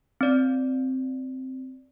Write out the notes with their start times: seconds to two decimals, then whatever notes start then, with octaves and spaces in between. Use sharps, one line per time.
0.21 C4 D5